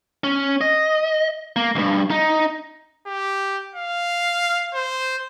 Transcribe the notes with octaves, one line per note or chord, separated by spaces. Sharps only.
C#4
D#5
A#3
B1 G2
D#4
G4
F5
C5